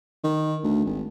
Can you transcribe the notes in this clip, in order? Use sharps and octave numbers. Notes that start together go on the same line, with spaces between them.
D#3
D2
G#1